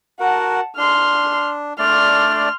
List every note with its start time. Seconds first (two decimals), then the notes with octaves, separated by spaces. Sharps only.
0.20 F#4 A#4 F#5 A5
0.77 D4 C6 F6
1.79 A3 D4 D5 C6 F6